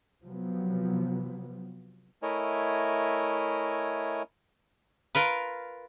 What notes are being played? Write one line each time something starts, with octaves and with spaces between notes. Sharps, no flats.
C3 F3 F#3 B3
A3 E4 A#4 C#5 D#5 G#5
F4 A#4 B4